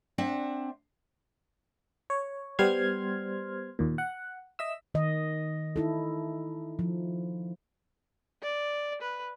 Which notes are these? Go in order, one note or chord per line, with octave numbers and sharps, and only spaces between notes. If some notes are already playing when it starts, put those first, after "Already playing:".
C4 D4 E5 F#5
C#5
G3 B3 C5 C6 F6 G#6
D#2 A#2
F#5
D#5 E5 E6
D#3 D#5
D#4 E4 A4
F3
D5
B4